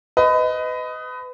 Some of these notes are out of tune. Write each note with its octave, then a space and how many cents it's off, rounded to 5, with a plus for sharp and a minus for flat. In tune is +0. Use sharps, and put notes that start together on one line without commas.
B4 +30 D#5 +10